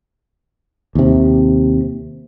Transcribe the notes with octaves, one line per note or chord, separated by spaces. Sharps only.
D#2 C3